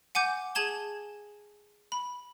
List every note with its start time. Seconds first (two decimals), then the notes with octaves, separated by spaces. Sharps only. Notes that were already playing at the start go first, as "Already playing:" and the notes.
0.15 F#5 G#5 D6 G6
0.55 G#4 G#5 A5 G#6 E7 G7
1.92 B5